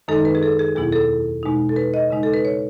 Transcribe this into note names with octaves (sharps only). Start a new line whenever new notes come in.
F#2 D#3 G#3 D#4 A4
B4
G#4
A4
G#4
E2 B2 F#3 B3 E4 G#4
A4
B2 G#3 D#4
A4
B4
D#5
C#3 G#3 D#4
A4
B4
C#5